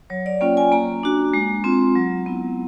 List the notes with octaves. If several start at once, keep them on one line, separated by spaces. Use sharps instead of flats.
F#3 C#5
D5
A#3 C#4 F4 G5
G#5
A#3 A#5
D4 F#4
G#3
C4 F4
F#3
B3 E4